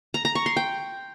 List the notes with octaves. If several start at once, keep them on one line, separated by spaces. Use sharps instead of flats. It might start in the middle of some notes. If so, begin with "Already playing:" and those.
A#5
A#5
C#6
C6
G5